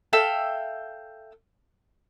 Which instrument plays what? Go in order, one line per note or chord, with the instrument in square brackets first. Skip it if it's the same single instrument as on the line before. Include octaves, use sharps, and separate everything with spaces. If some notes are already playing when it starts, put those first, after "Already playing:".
[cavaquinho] A4 E5 F5 G5